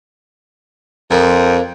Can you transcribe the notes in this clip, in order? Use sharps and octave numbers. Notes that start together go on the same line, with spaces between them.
F2 F3 A#3